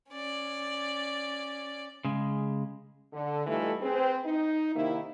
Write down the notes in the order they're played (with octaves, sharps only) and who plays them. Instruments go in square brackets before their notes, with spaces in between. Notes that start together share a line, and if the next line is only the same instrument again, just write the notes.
[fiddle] C#4 D5
[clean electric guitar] C#3 G#3
[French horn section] D3
E3 G3 A3 D#4 F4 A4
C4 G#4 B4
D#4
C3 D#3 A#3 E4